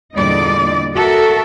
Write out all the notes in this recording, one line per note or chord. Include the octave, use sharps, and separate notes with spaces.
E2 A#2 D3 G3 D5 D#5
F#4 A4 A#4 E5